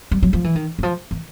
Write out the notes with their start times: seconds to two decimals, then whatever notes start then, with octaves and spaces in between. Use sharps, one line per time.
0.11 G3
0.23 F#3
0.33 F3
0.44 E3
0.55 D#3
0.79 E3
0.83 F3
1.11 E3